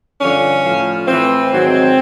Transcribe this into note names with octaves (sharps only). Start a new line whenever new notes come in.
G2 D3 F3 C#4
A2 F3
A2 E3 C4
G#2 D#3 F#3